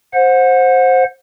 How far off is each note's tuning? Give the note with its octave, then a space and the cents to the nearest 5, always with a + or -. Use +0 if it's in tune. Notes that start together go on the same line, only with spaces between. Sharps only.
C5 +10 F#5 -25